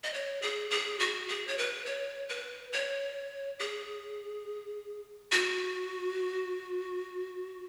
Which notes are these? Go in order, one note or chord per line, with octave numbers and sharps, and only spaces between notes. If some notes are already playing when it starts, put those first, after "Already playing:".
D#5
C#5
G#4
G#4
F#4
G#4
C#5
B4
C#5
B4
C#5
G#4
F#4